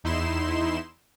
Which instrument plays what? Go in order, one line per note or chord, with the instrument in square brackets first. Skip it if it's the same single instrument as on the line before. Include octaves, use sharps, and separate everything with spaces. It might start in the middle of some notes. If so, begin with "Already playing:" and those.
[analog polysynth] E2 D#4 E4 C6 E7